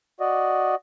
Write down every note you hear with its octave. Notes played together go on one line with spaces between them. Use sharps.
F#4 D5 D#5